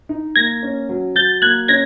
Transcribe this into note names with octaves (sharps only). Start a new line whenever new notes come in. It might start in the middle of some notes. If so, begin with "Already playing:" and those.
D#4
A#3 G#6 A#6
C#4
F#3
F#3 G6 A6
A#3 F#6 G#6
C#4 G#6 A#6